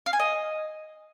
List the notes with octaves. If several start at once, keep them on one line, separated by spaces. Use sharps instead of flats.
F5
G#5
D#5